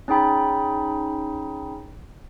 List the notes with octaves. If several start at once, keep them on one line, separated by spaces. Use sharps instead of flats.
C#4 D#4 G#4 G5 B5